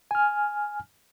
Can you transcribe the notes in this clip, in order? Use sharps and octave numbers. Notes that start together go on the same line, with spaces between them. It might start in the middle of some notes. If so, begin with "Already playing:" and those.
G#5 F6